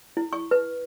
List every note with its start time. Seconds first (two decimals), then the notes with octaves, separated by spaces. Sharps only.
0.17 E4
0.33 C#6
0.51 B4